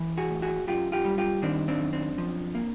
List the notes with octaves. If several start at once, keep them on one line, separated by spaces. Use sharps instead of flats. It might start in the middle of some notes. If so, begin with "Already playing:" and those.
Already playing: E3
F#4 G#4
A2
F#4 G#4
F#2 F4 G4
F4 G4
G3
F4 G4
D#3 C4 D4
C4 D4
F#2
C4 D4
F3
A#3